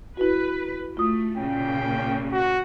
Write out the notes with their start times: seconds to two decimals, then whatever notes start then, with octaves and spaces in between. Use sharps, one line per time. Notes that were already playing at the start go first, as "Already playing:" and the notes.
0.17 E4 F#4 B4
0.97 A3 F4 D#6
1.38 A#2 C#3 G5
2.32 F#4